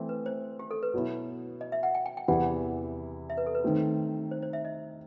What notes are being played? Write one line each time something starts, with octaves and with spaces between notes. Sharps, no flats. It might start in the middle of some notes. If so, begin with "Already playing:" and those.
Already playing: E3 A3 C4
B4
C5
G4
A4
B4
B2 F#3 B3 E4
D#5
E5
F#5
G5
G5
G5
E2 C3 E3 B3 E4 F#5
E5
B4
A4
B4
D#3 A3 C4
C5
C5
E5
D#5